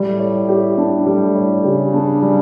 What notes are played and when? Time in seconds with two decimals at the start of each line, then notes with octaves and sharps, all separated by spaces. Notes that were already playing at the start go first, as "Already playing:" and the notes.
Already playing: A2 G3
0.19 C#5
0.48 G4
0.77 D4
1.06 G3
1.35 C#5
1.64 C#3 G4
1.93 D4
2.22 G3